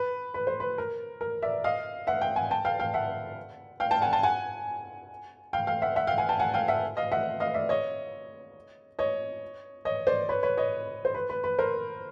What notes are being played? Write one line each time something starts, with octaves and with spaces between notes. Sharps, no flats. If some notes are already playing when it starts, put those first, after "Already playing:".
Already playing: B4
B4
C5
B4
A#4
A#4
D5 E5
D#5 F5
E5 F#5
F5 G5
F#5 G#5
G5 A5
F5 G5
F5 G5
E5 F#5
F5 G5
G5 A5
F#5 G#5
G5 A5
F#5 G#5
F5 G5
F5 G5
E5 F#5
E5 F#5
F5 G5
F#5 G#5
G5 A5
F#5 G#5
F5 G5
E5 F#5
D#5 F5
E5 F#5
D#5 F5
D5 E5
C#5 D#5
C#5 D#5
C#5 D#5
C5 D5
B4 C#5
B4 C#5
C#5 D#5
C5
B4
B4
B4
A#4 C5